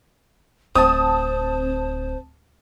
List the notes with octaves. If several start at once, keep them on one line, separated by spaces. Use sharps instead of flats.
D1 C4 C5 A5 D#6